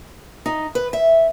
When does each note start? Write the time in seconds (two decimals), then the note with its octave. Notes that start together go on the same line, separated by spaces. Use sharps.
0.46 D#4
0.75 B4
0.93 E5